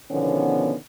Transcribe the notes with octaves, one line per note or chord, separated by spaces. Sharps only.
B2 D3 D#3 F3 B3 C#4